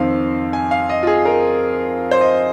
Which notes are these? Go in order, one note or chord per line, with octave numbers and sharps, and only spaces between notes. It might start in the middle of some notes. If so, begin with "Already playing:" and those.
Already playing: F2 D#3 C4 F5
G#5
F5
D#5
F4
G#4
A#4
C5
D#5